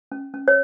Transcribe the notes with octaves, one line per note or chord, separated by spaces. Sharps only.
C#4
C#4
C#5